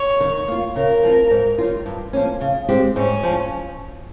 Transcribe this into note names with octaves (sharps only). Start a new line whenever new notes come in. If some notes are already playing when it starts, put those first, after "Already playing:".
Already playing: C#5
D#3
A#3 F4
C#3 A#4
F3 C4 F4
G#2
D#3 G3 C#4 F4
G2
F3 A#3 C#4
C#3
G#3 C4 G4
G#2 C#4
F3